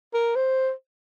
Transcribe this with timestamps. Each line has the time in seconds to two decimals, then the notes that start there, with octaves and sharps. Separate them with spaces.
0.14 A#4
0.36 C5